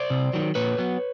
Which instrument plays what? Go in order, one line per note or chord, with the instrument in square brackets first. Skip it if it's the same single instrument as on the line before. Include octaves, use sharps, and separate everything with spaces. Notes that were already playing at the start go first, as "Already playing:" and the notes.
Already playing: [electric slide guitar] C5 D5
C3
D#3 F#3
A#2 B4 C#5
F#3 B3